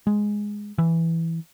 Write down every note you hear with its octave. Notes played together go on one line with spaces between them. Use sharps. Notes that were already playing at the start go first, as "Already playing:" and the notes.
G#3
E3